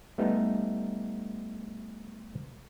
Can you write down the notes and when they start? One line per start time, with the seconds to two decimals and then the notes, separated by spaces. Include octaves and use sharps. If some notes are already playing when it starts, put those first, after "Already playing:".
0.18 G3 A3 B3 D#4